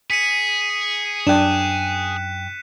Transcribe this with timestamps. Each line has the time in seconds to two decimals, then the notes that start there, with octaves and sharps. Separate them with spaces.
0.10 G#4 B6 C#7 D#7
1.27 F#2 D4 G5 F#6 E7